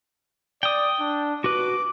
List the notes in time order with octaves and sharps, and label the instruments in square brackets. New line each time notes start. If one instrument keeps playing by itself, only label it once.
[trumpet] D5 [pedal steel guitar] G5 D#6
[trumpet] D4
[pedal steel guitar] F#4 B4 [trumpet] D6